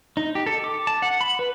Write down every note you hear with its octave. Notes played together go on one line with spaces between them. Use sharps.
D#4
G4
A4
D6
A5
F#5
B5
B4